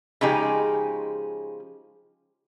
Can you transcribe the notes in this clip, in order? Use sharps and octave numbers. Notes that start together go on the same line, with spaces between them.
C#3 F3 G#3 D#4 G4 G#4